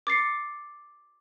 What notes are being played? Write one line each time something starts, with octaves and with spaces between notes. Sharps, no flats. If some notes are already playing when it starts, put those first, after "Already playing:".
D6 A6 C7 C#7